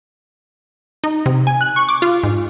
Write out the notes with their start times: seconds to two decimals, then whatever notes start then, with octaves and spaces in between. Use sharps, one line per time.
1.04 D#4
1.26 C3
1.47 G#5
1.61 F#6
1.76 C#6
1.89 D6
2.02 F4
2.23 G#2